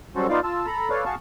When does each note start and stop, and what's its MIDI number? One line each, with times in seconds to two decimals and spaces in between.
0.16 0.27 54
0.16 0.27 55
0.16 0.27 61
0.16 0.27 66
0.16 0.27 69
0.16 0.27 72
0.29 0.40 59
0.29 0.40 63
0.29 0.40 65
0.29 0.40 74
0.29 0.40 77
0.44 0.66 65
0.44 0.66 81
0.44 0.66 88
0.66 0.90 69
0.66 0.90 82
0.66 0.90 83
0.90 1.04 69
0.90 1.04 71
0.90 1.04 73
0.90 1.04 74
0.90 1.04 77
1.05 1.15 66
1.05 1.15 68
1.05 1.15 77
1.05 1.15 81
1.05 1.15 85